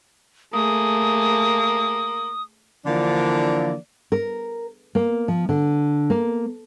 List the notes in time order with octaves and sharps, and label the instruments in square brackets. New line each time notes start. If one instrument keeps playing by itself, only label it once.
[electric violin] A3 G#4 [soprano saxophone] A#3 [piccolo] D#6
[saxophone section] D3 E3 F3 A#3 D4 D5
[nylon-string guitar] A#4
A#3
F3
D3
A#3